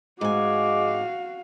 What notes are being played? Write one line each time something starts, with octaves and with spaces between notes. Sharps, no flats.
G#2 G#3 F#4 F5 G#5 D6